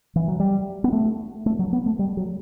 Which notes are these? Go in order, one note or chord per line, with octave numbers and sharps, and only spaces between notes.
E3
F#3
G3
B3
A3
A3
F#3
B3
A3
G3
F#3